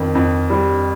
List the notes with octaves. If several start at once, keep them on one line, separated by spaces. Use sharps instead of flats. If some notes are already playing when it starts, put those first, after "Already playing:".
Already playing: F2 D#3
F2
G3